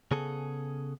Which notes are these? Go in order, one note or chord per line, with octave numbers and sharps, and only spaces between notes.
C#3 B3 G#4 A4